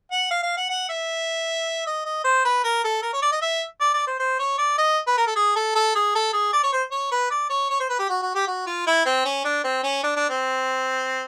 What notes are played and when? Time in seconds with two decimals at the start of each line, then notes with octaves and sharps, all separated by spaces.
0.12 F#5
0.31 F5
0.43 F5
0.57 F#5
0.70 F#5
0.89 E5
1.87 D#5
2.06 D#5
2.25 C5
2.45 B4
2.64 A#4
2.84 A4
3.03 A#4
3.13 C#5
3.22 D5
3.32 D#5
3.42 E5
3.81 D5
3.94 D5
4.07 C5
4.20 C5
4.39 C#5
4.58 D5
4.78 D#5
5.07 B4
5.18 A#4
5.27 A4
5.36 G#4
5.56 A4
5.75 A4
5.95 G#4
6.15 A4
6.33 G#4
6.53 D5
6.64 C#5
6.73 C5
6.92 C#5
7.11 B4
7.31 D5
7.50 C#5
7.70 C#5
7.80 C5
7.90 B4
7.99 G4
8.09 F#4
8.22 F#4
8.35 G4
8.48 F#4
8.67 F4
8.87 E4
9.06 C4
9.25 C#4
9.45 D4
9.64 C4
9.84 C#4
10.04 D4
10.16 D4
10.30 C4